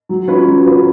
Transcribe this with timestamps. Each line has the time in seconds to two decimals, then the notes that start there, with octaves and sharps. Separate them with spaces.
0.09 F#3
0.28 C#4 F4 B4
0.47 F#3
0.66 C#4 F4 B4